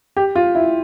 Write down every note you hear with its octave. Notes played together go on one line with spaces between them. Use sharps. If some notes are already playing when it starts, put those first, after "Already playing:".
G4
F4
E4